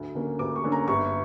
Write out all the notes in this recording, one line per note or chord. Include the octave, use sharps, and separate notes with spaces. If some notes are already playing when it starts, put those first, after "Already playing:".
Already playing: D2
D3 A#3 C#4
D2 D6
C#6
D3 A#3 C#4
A#5
G1 C#6